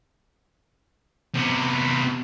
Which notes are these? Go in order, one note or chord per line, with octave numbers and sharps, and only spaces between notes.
C3 B3